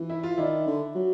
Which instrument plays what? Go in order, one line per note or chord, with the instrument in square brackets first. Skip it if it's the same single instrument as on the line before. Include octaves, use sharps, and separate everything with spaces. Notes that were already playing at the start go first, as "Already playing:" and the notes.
Already playing: [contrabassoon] E3
[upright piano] E4
F4
[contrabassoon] D#3 [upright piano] D4 E4
[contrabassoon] D3
F#3